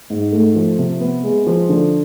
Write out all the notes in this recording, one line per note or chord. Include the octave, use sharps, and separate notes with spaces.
G#2
A3
F3
C3
B3
G#3
F3
D3